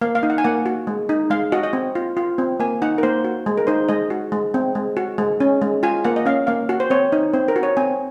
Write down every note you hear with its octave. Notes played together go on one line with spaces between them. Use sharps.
A#3 F5
F5
D#4
F#5
G#5
A#3 F#5
F#4
G#3
D#4
G#3 F5
F#4 D#5
D#5
C4
F4
F4
C4
A#3 G#5
D#4 F#5
A#4
A#3 C5
F#4
G#3
A#4
D#4 C5
G#3 D#5
F#4
G#3
C4
G#3
F#4
G#3
C#4
G#3
F4 G#5
A#3 F#5
D#5
C#4 F5
A#3 F5
F#4
C5
C4 C#5
D#4
C4 C5
A#4
F#4
C#5
C4 G#5